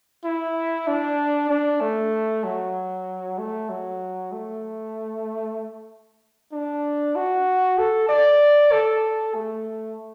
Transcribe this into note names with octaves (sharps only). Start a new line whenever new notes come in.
E4
D4
D4
A3
F#3
A3
F#3
A3
D4
F#4
A4
D5
A4
A3